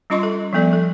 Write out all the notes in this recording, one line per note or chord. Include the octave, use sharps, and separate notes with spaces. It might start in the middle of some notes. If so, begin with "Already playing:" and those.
G3 C#4 F4 D#5 C6 C#6
A4
F3 G3 B3 A4 D5
A4